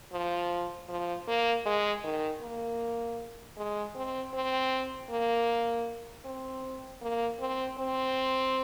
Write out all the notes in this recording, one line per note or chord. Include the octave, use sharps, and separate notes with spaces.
F3
F3
A#3
G#3
D#3
A#3
G#3
C4
C4
A#3
C4
A#3
C4
C4